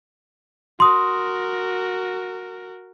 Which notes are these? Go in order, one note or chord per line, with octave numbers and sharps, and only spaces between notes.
F#4 A#4 C6 D#6